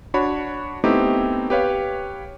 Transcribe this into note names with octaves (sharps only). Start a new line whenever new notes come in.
D4 F#4 C#5 B5
A3 B3 C4 D#4 E4 G4
G4 B4 C#5 F5